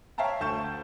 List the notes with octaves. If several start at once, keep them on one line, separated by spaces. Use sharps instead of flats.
C#5 E5 F5 G5 A5 A#5
D2 A5 C#6 G6 E7